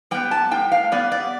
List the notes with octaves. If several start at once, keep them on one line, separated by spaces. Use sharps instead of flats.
G3 B3 G5
A5
A2 G5
F5
G3 B3 D5
D5